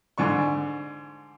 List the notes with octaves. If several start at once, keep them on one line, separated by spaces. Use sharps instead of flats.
G#2 D3 D4 C#6